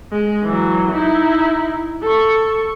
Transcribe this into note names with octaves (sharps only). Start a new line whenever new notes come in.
G#3
E3 F#3
D#4 E4
A4 C#6